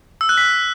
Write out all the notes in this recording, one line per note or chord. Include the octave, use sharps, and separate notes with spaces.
E6
F#6
B6